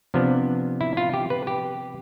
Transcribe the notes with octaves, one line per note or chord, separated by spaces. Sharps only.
C3 F3 B3 D4
E4
F4
G4
B4
G4